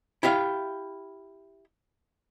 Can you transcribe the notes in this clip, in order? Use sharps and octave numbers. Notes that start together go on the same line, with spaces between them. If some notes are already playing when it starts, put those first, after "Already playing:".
E4 G4 E5 F5